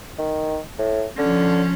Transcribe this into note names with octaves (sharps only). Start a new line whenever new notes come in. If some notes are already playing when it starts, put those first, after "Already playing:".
D#3
A2
D3 F3 C#4